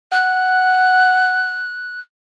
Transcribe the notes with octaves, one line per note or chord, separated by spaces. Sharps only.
F#5 F#6